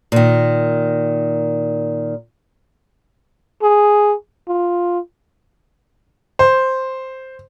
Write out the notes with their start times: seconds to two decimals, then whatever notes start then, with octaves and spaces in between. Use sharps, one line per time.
0.12 A#2 D#3
3.62 G#4
4.48 F4
6.39 C5